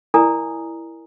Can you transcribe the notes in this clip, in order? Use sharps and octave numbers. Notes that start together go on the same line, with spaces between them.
E4 A#4 D5 G#5 A#5 D#6